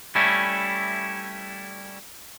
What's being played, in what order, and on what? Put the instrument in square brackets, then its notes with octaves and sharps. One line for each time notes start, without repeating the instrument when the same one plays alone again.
[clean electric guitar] G3 A3 C#4 E4